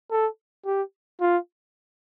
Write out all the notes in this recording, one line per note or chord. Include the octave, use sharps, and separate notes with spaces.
A4
G4
F4